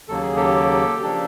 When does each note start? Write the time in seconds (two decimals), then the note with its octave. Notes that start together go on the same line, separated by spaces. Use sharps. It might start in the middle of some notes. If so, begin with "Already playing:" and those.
0.08 D#2 C#3 F#3 A#3 A4
0.22 G#4
0.36 G4 A4
1.02 C#3 F3 A#3 D4 G4 A4